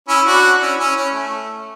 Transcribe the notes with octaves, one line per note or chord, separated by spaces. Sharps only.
C#4 E4
D4 F#4
C#4 E4
C#4 E4
C#4
A3